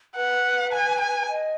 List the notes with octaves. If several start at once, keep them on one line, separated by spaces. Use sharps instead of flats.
B4 F#5
G#5
G#5
D#5